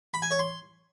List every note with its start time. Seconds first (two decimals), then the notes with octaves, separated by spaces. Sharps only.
0.14 B5
0.22 G#5
0.31 C#5
0.39 C6